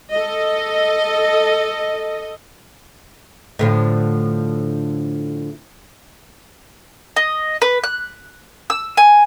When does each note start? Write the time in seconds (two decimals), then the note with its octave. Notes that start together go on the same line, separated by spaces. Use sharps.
0.13 A4 D#5
3.59 A2 D3 F3
7.17 D#5
7.62 B4
7.84 F#6
8.70 E6
8.97 G#5